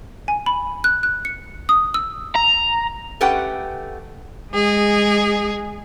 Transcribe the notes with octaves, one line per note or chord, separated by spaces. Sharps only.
G#5
B5
F#6
F#6
C#7
D#6
E6
A#5
A3 C#4 G4 B4 F#5 G5
G#3 G#4